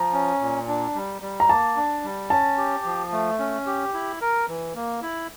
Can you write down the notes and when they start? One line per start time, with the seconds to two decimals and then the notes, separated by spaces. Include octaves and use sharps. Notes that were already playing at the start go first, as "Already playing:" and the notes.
Already playing: F3 A#5
0.13 C#4
0.41 A#2
0.68 D4
0.95 G3
1.22 G3
1.40 A#5
1.49 A#3 A5
1.76 D4
2.04 G3
2.30 C#4 A5
2.57 G4
2.85 F3
3.12 A3
3.39 C#4
3.66 G4
3.94 E4
4.21 A#4
4.48 E3
4.75 A#3
5.02 E4